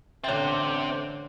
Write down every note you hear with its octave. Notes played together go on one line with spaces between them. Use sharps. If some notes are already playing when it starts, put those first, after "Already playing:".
A1 D3 C4 G4 C#5 E5